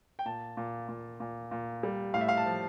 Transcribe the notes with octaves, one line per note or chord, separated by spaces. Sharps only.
G5
A#2 A5
A#2
A#2
A#2
A#2
G3
A2 F5
E5
F5
A5
F3